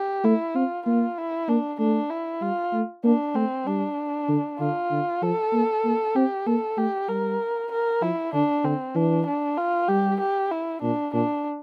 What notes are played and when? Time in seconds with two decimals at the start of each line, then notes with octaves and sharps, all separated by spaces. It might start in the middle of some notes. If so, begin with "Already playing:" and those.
Already playing: G4
0.24 A3 E4
0.55 C4 F4
0.86 A#3 F4
1.18 E4
1.49 A#3 D4
1.79 A3 D4
2.10 E4
2.41 G3 F4
2.73 A3
3.04 A#3 D4
3.35 A3 C4
3.66 G3 D4
4.29 D3
4.59 D3 F4
4.91 D3
5.22 F3 A4
5.53 A#3
5.84 A#3
6.15 C4 G4
6.47 A#3 A4
6.78 A3 G4
7.09 G3 A#4
7.72 A#4
8.02 F3 E4
8.33 D3 D4
8.64 D3 C4
8.95 E3 D4
9.26 D4
9.57 F4
9.88 G3 G4
10.20 G4
10.51 E4
10.82 A#2 D4
11.14 A#2 D4